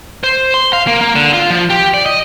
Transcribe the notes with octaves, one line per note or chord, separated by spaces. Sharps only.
C5
C6
F5
A#3
A#3
D3
F4
F3
G4
D5
D#5